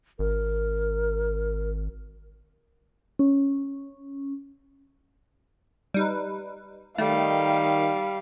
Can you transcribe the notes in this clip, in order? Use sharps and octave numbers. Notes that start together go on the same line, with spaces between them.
G#1 A#4
C#4
G3 D#4 B4
D#3 G3 A3 F5